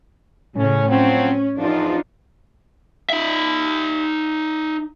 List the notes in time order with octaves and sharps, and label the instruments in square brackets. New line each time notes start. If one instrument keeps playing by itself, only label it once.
[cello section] A2 C#3 [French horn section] C#4
[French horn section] F3 F#3 C4 [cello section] C#4
[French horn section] E2 F3 [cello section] D4 D#4 F4
[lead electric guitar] D#4 E5